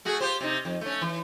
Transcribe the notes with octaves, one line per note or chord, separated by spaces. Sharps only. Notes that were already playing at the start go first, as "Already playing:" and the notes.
A3 F#4 G#4
F4 G4 C5
C3 D#4
F2
A3 C#4
E3